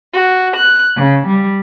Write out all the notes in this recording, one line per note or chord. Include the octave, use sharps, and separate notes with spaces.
F#4
F#6
C#3
G3